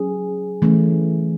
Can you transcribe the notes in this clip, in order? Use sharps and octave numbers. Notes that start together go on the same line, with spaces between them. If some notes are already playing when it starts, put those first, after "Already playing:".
Already playing: F#3 C#4 G#4
E3 A3 C#4